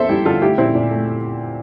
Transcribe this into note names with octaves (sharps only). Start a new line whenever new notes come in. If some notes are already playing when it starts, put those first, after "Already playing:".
Already playing: E2 A#3 A4 C5 E5
G3 E4 G4
D3 F4 A4
A3 E4 G4
A#2 C4 E4
A#2
A3